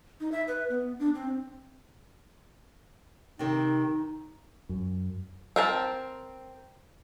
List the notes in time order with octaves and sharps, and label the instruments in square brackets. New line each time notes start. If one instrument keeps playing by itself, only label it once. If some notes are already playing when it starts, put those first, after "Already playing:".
[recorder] D#4
E5
B4
B3
D4
C4
[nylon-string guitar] C3 D#3 [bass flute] D#4
[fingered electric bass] F#2
[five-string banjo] C4 A#4 A5